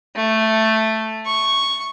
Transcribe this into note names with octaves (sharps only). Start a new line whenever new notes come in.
A3
C#6